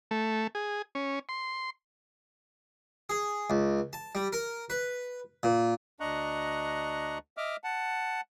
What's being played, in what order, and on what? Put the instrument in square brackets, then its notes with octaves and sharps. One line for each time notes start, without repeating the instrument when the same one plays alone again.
[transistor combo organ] A3
G#4
C#4
C6
[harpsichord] G#4
C#2
A5
G3
A#4
B4
A#2
[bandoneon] D2 D4 D#5 A#5 C#6 F#6
D#5 E5 D6 F6
F#5 A5